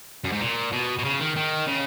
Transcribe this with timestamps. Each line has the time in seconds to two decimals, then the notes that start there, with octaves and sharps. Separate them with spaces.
0.24 F#2
0.32 G#2
0.40 A#2
0.72 B2
0.99 B2
1.04 C#3
1.20 D#3
1.36 D#3
1.67 C#3